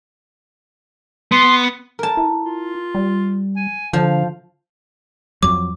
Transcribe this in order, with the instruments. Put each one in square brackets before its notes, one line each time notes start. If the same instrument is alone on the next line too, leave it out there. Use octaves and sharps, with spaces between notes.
[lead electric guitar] B3 [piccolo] C6
[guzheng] A#4 A5
[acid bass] E4
[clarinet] F4
[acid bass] G3
[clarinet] G#5
[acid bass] D3 [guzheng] F3 [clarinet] F5
[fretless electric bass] F2 F#3 [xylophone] D6